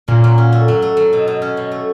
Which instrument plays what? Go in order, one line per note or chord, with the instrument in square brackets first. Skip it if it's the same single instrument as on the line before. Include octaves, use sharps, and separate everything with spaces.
[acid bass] A#2 [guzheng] C#4
[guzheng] F#3
C#4
A3
F#3
A3
F#3
B2
B2
C#4
B2
A3